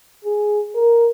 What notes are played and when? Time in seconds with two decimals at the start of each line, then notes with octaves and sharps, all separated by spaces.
0.25 G#4
0.75 A#4